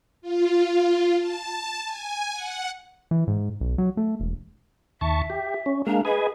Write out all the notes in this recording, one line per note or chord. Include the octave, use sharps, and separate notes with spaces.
F4
A5
G#5
F#5
E3
G#2
B1
F#3
A3
E1
D#2 E5 A5 C#6
G4
C#4
G#3 A#3 D4 F5
G#4 B4 D#5 G#5